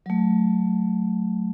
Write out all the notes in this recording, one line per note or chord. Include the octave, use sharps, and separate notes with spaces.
F#3 A3